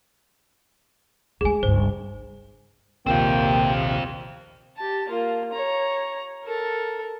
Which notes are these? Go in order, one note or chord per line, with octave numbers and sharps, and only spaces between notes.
D2 G#3 G#4 G#5
G1 C#2 C5
A#1 D#2 C3 A#3 C4 F4 G5
G4 A5
A#3 F4
C#5 A#5
A4 A#4